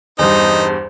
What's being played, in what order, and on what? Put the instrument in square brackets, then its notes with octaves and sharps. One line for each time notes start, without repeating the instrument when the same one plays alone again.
[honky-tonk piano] E2 G2 [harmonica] D#4 [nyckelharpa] C5